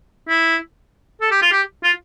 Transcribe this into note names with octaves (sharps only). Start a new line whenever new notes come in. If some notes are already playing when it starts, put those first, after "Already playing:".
E4
A4
G4
F4
G4
F4